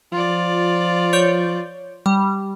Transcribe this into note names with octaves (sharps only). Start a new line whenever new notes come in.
F3 F4 D5
C#5 G6 D7
G3